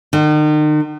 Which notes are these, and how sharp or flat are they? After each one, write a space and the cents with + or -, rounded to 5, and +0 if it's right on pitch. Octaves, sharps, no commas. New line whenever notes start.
D#3 -40